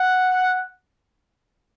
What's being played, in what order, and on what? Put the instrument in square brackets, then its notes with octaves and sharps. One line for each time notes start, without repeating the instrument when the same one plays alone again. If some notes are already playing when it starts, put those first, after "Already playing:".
Already playing: [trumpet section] F#5